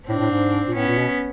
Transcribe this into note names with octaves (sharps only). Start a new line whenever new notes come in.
A2 C4 D4
A2
G#2
A#2
A2 B3 C#4
A#2
B2